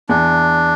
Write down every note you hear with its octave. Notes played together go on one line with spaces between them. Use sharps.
E2 D4